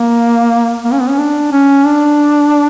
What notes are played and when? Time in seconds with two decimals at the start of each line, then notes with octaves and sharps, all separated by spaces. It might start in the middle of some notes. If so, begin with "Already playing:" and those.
Already playing: A#3
0.84 A#3
0.93 C#4
1.01 B3
1.09 C#4
1.18 D4
1.52 C#4
1.86 D4